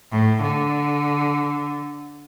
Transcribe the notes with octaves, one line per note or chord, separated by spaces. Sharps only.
A2
D3